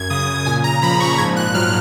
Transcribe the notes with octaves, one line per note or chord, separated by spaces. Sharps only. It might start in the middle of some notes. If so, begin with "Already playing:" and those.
Already playing: F#2 G#6
C#3 D#6
A#2 G#5
A#5
F3 B5
C#6
G#2 G#6
F#6
F#3 F6